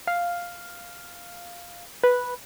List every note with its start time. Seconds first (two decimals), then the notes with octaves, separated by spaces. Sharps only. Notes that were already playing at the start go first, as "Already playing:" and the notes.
0.07 F5
2.04 B4